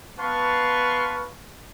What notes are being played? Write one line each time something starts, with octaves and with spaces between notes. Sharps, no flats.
B3 B4 F5 A5 C6 C#6